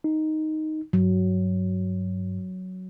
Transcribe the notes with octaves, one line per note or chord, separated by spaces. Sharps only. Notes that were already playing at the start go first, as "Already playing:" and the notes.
D#4
G2 F#3